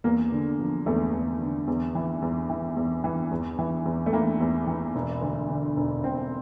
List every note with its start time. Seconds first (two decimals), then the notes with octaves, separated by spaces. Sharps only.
0.04 E2 A#3
0.32 D3
0.59 F3
0.86 E2 A3
1.13 E2
1.41 D3
1.68 E2
1.95 E3
2.22 E2
2.50 E3
2.77 E2
3.04 E3
3.31 E2
3.59 E3
3.86 E2
4.06 A3
4.13 E3 A#3
4.40 E2
4.67 E3
4.95 E1
5.22 D2
5.49 D3
5.76 E1
6.03 E1 C4